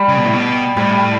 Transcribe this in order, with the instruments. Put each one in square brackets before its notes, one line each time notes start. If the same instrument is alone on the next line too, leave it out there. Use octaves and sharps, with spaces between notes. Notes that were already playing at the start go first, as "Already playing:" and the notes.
Already playing: [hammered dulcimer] G3
[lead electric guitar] C#3
B2
A2
B2
[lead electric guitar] A2 [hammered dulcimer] G3